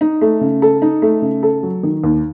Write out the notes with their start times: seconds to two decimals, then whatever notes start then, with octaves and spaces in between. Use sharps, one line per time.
0.01 D#4
0.21 A3
0.41 C#3
0.62 A4
0.82 D#4
1.02 A3
1.22 C#3
1.43 A4
1.63 F#3
1.83 D#3
2.04 D#2